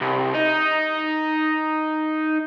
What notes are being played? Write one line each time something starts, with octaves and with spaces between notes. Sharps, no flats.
C2
D#4